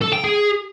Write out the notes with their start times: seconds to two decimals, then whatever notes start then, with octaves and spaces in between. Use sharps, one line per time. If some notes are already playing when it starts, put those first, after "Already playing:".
0.01 A4
0.13 G5
0.24 G#4